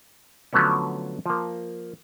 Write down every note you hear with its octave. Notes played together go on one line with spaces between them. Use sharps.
D3 F3 F#3 A3 B3 C#4
F3 A#3